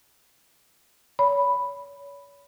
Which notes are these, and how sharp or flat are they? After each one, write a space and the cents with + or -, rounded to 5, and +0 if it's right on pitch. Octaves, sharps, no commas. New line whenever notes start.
C#5 +35 B5 +0